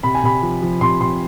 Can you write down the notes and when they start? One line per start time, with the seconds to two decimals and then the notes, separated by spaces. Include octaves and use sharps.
0.03 C3 B5
0.15 G#5
0.23 C3 B5
0.42 F3
0.62 F3
0.81 C3 C6
1.01 C3 C6